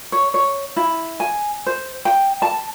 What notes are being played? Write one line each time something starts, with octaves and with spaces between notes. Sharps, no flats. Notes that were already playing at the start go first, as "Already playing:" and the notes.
C#5
C#5
E4
G#5
C5
G5
A5